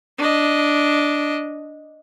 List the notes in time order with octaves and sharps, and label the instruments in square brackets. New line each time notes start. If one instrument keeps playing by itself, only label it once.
[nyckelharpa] D4 D#5